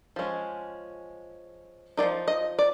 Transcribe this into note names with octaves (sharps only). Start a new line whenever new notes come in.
F3 G#3 C#4
F3 A#3 D#4 D5
D#5
D5